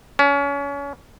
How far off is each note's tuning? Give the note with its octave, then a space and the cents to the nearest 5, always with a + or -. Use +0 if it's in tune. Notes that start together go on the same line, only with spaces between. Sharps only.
C#4 +30